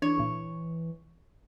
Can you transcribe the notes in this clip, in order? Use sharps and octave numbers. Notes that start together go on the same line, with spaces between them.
E3 D4 C#5
C#2 A#2